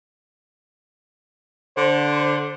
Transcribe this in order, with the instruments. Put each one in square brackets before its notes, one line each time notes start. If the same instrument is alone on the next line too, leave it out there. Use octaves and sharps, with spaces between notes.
[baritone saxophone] D3 [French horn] C5